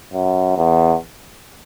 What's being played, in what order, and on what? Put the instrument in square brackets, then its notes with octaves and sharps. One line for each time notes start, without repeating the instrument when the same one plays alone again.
[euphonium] F#2
E2